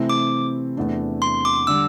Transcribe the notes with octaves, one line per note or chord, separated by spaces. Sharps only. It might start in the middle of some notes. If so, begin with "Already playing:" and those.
Already playing: C3 E3 A3 C4 E4
D6
E2 C3 A3 D4
C6
D6
D3 G3 D4 E6